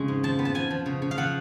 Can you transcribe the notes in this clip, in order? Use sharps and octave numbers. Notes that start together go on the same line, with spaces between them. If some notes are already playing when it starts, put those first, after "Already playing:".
Already playing: F2 C#3 G#3
G#2
F3 A5
B3
A5
F3 G#5
F3
C#3
C#3
F5
F3 F#5